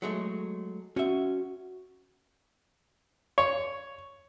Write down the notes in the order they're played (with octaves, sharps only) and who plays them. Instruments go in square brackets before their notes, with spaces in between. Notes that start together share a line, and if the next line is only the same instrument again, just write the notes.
[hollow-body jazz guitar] F#3 G#3 A3
[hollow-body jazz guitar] C#4 E5 [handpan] F#4
[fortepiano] C#5